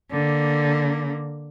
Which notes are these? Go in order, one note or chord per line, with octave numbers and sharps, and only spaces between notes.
D3 A#3